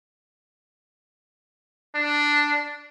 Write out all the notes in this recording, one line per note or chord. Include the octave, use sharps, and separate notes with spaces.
D4